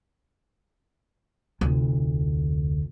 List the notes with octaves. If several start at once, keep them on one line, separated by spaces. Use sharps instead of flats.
F1 D2